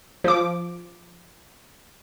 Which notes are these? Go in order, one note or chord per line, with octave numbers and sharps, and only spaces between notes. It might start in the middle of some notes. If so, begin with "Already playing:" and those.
F3 D6